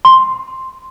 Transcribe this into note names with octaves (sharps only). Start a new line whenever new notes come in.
C6